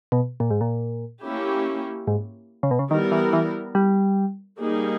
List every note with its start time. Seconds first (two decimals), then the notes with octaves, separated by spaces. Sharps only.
0.12 B2
0.40 A#2
0.50 G#2
0.61 A#2
1.24 A#3 C#4 E4 G4
2.07 G#2
2.63 C#3
2.71 B2
2.79 C#3
2.91 D#3 G3 B3 E4 A#4
3.12 E3
3.33 E3
3.75 G3
4.59 G3 A#3 D#4 G#4